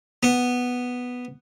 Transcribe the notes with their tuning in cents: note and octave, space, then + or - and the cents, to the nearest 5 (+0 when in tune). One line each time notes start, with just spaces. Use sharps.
B3 +0